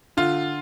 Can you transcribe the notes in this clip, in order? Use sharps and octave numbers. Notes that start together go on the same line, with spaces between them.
D3 F4